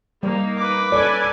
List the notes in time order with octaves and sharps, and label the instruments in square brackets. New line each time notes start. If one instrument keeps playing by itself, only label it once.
[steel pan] G3 [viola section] A#3 D#4
[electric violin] B4 D6
[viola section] C#4 A4 G#5 [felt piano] D5